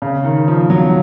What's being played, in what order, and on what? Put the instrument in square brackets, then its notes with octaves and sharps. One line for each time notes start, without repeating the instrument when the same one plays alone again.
[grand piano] C#3
D#3
F3
F#3